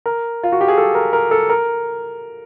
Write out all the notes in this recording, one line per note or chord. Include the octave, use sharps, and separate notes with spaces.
A#4
F4
F#4
G4
G#4
A4
A#4
A#4
A4
A#4